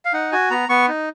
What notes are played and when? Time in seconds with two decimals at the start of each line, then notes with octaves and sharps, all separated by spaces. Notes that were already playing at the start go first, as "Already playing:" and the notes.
0.05 F5
0.13 D#4 F#5
0.32 F#4 G#5
0.51 B3 A#5
0.69 B3 C#6
0.88 D#4